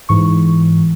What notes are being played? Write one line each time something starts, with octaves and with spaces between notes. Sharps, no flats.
G#2 E3 C#6